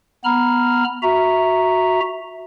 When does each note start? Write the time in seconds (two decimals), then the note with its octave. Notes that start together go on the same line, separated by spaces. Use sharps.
0.24 B3 A#5 B5 F6
1.03 F#4 E5 A#5